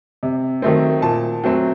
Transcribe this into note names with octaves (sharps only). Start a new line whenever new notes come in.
C3
D#3 F#3 A3 C4
A#2 A5
F#3 A3 C4